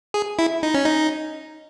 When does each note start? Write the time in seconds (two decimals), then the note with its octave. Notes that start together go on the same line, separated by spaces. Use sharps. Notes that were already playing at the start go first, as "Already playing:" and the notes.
0.14 G#4
0.39 E4
0.63 D#4
0.74 C#4
0.85 D#4